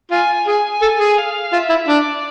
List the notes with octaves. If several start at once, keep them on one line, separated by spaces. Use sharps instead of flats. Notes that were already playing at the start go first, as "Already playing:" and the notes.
F4 G#5
G#4 G#5
A4
G#4
F5
F4 E5
E4
D4 D5